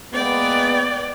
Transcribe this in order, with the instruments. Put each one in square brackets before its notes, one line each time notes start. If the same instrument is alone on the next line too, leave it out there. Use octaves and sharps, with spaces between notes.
[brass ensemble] G#3 A#3 B3 [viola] D5 G5